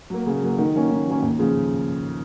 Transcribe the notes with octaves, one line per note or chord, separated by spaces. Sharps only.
F#3 A#3
C#3
F#3 A#3
D#3
F#3 A#3 C#4
D#3
F#3 A#3 C#4
D#2
C#3 F3